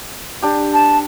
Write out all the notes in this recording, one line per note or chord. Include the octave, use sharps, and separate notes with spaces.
D4 G4
A5